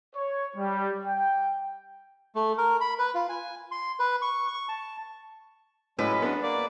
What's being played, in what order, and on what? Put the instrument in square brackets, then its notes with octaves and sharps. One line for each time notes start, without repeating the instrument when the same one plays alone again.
[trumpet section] C#5
G3
G5
[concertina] A3
A#4
B5
B4
F4
G#5
C6
B4
C#6
C#6
A5
[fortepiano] A2 [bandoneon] F#3 G#3 C#4 [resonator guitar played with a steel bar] B4
[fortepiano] B3 D4
[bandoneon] A#3 D5